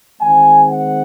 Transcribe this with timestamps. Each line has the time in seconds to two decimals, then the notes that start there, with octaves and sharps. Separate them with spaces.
0.21 D#3 G#3 C4 G#5
0.67 F#5